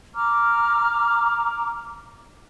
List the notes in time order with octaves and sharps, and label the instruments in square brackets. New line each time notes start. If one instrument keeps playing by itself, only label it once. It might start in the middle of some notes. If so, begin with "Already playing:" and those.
[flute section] A#5 D6 F6